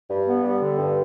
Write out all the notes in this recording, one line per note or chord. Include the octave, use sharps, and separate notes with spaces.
G2
B3
G3
D3
G2